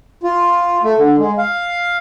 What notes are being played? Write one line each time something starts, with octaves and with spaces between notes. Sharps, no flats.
F4
A3
D3
G#3
F5